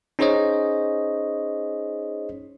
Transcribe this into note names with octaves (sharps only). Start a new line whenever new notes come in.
C#4 D#4 G#4 C5 C#5 D#5